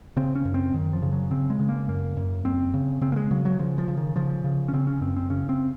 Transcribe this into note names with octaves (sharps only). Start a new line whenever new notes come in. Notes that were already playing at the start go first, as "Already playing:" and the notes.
C#3 C4
C#4
F#2
C4
F#2 D#3
F3
C#3
F#3
C#3 C4
G#3
C#3
A#3
F#2 A#3
F#2
F#2 C4
C#3
C#3 C4
A#3
G#3
C#3 F#3
F#3
C#3 F3
F3
C#3
D#3
C#3 F3
C#3
C#4
C#3 C4
C#4
F#2 C4
C4
C#3 C#4
C4